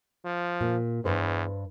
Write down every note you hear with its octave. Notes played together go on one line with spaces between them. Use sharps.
F3
A#2
E2 G2 B4 C5